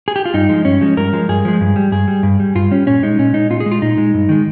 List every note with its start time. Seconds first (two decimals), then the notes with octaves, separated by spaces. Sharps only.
0.08 G#4
0.16 G4
0.26 F4
0.34 G2 D#4
0.49 F3 G#3
0.65 G2 C#4
0.81 F3 G#3
0.97 G2 A#4
1.13 F3 G#3
1.29 G2 G#4
1.45 F3 G#3
1.61 G2
1.76 G3
1.92 G2 G#4
2.08 G3
2.23 G2
2.40 G3
2.55 G2 F4
2.71 G3 C#4
2.87 A#2 C#4
3.03 G#3 D#4
3.19 A#2 C#4
3.34 G#3 D#4
3.50 A#2 F4
3.60 G#4
3.66 G#3
3.72 F4
3.82 A#2 D#4
3.98 G#3
4.14 G2
4.29 D#3 G#3